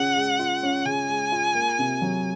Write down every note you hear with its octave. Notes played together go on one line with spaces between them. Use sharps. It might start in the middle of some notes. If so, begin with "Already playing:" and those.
Already playing: C#3 C#4 F4 F#5
G#3
F4
C#4
C#3 G#5
G#3
F4
A#3
C3
F#3